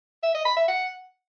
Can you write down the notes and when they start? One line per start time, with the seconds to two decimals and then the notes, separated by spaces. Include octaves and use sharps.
0.23 E5
0.34 D#5
0.46 B5
0.57 E5
0.68 F#5